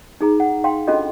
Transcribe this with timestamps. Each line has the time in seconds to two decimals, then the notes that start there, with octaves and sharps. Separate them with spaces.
0.21 D#4 G#4 A#5
0.40 F#5
0.64 F5 G5 C6
0.88 C#4 D4 F4 F#4 A4 D#5